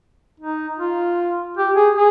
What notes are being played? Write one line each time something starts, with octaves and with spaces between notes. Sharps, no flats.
D#4
F4
G4
G#4
G#4